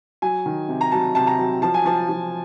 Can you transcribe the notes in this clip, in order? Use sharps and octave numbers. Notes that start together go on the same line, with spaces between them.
F#3 G#5
D#3
C3
A#5
F#3 A5
C3 A5
A#5
F#3
F3 A5
G#5
F3 A5
F3